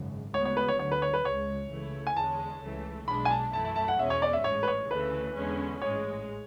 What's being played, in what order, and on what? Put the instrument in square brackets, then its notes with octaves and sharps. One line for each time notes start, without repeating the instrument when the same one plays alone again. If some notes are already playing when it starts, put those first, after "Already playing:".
Already playing: [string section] G#1 F#2 C#3
[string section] D2 C#3 G#3 B3 F#4 [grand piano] C#5
[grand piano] C#5
B4
C#5
[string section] D2 D3 F#3 [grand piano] C#5
[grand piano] B4
C#5
B4
[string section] C#2 C#3 G#3 [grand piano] C#5
[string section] C#2 C#3 E3 A3 E4
[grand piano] G#5
[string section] E2 D3 G#3 C#4 [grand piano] A5
[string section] C#2 C#3 E3 A3
[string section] B1 B2 G#3 D4 [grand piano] B5
[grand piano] G#5
A5
[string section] F#2 E3 A3 E4 [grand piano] A5
[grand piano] A5
A5
F#5
[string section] E2 B2 G#3 C#4 [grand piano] E5
[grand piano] C#5
D5
E5
[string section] A1 G#2 G#3 [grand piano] C#5
[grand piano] B4
C#5
[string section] D2 C#3 E3 A3 [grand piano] B4
[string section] E2 D3 G#3 C#4
[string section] A1 G#2 G#3 [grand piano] C#5